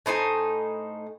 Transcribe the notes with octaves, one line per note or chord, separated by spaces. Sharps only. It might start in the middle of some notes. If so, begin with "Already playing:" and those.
A2 D#4 C5 G#5